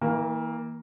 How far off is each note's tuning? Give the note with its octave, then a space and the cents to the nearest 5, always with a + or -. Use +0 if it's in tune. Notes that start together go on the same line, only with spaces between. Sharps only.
E3 -40 A#3 +0